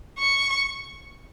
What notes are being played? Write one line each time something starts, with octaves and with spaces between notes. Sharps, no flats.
C#6